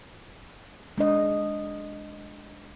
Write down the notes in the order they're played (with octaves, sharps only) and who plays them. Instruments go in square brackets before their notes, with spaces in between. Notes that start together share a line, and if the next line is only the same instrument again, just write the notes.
[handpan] G#3 D4 D#5